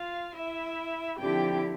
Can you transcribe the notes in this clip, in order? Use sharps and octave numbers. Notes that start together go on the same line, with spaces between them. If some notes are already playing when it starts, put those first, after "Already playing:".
Already playing: F4 F5
E4 E5
D3 F3 C4 E4 G4 G5